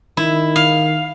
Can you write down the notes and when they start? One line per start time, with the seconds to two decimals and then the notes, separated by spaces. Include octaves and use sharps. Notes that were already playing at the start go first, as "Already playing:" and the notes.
0.17 D#3 E4
0.56 F5